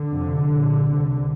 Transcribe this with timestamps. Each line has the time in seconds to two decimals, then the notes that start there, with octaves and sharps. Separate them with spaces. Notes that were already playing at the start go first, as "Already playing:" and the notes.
Already playing: D3
0.13 F2 C3
0.48 C2
0.53 A#2
0.85 C2 C3